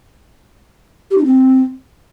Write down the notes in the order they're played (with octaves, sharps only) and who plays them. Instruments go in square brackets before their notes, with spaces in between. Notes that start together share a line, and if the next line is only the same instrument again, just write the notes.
[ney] G4
D#4
C4